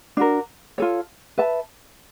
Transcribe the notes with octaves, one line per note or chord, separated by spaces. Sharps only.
D4 F#4 A#4
F4 A4 C#5
B4 E5 A5